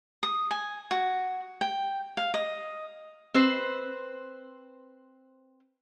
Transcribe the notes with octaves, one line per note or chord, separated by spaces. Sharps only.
D#6
G#5
F#4
G5
F5
D#5
C4 B4 C5